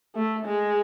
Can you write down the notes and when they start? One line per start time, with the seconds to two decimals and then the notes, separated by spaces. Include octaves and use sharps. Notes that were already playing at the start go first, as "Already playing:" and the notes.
0.15 A3
0.45 G#3